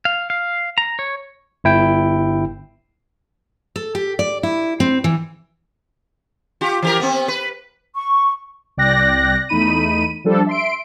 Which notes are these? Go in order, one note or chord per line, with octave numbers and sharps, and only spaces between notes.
F5
F5
A#5
C#5
G1 E4 G5
A4
G4
D5
E4
C4
E3
F4 G4
E3 G4 A#4
B3 C4
B4
C#6
C2 D5 G5 F#6 A#6
E2 A3 D#4 B5 D#7
F3 G3 D4 A4
E5 C6 D7